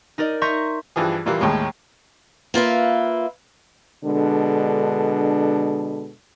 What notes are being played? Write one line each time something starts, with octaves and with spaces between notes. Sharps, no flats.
D#4 A#4 D5 D#5
D#5 E5 A#5 C6 C#6 G6
G2 E3 F3 G#4
A#2 E3 G3 A#3
D#2 A2 G#3
A#3 F4 B4 E5
B2 D3 G#3 D4 A4